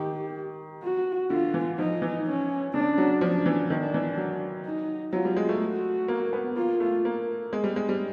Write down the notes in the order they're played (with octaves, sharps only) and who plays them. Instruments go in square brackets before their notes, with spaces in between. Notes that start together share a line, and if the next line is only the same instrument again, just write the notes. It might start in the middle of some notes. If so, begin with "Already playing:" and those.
Already playing: [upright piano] D#3 [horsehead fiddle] G4
[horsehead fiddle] F#4
[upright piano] D3 [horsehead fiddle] F4
[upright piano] E3
[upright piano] F3 [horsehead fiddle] D#4
[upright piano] E3
[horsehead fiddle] C#4
[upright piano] C#3 [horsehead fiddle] D4
[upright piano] F#3
[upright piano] F3 [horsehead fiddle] D4
[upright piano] E3
[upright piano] D#3 [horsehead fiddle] D4
[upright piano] E3
F#3
[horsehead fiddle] D#4
[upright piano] F#3 [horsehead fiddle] F4
[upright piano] G3
G#3
A3
[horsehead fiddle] F#4
[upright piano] A#3
B3
[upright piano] A#3 [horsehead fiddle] F4
[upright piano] A3
A#3
G#3
G3
G#3
G3